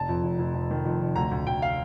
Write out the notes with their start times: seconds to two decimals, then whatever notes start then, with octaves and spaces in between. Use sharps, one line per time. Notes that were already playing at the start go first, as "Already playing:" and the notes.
Already playing: F1 A5
0.09 F2
0.24 F1
0.39 F1
0.54 F2
0.71 D#3
0.85 F2
1.01 F1
1.16 D2 A#5
1.31 D2
1.47 D2 G5
1.62 F5